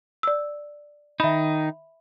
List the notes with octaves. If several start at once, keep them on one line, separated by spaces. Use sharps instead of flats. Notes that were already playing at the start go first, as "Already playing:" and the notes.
D5 E6
D#3 D#4 E5 B5